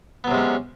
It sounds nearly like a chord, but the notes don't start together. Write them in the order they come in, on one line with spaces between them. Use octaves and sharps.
B3 F#3 C3 G#3 C#4